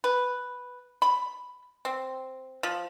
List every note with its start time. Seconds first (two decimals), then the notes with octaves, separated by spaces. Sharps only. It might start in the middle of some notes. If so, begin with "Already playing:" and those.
0.04 B4
1.02 B5
1.85 C4
2.63 F3